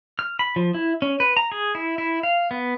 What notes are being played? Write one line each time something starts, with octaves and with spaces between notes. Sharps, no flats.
F6
B5
F3
E4
C#4
B4
A#5
G#4
E4
E4
F5
B3